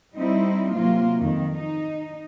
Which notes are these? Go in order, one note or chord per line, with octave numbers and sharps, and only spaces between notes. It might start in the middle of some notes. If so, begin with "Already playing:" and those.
G3 C4 D#4 E4
C3 F#3 A#3 F4
F2 D#3
D#4